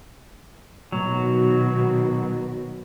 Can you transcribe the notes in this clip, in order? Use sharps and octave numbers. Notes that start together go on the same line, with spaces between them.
B2 D#3 F#3 F#4